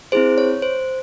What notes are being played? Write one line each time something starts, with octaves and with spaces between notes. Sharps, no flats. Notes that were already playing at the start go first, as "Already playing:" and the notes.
C4 E4 G#4 C5
C#5
C5